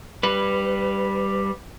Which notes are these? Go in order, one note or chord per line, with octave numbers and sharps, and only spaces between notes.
G3 B4